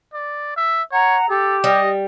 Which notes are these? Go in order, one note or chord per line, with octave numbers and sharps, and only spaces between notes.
D5
E5
C#5 F#5 A#5
G4 A4
G3 D#5